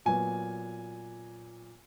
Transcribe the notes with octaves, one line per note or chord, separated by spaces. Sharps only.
A#2 F#3 B3 G#5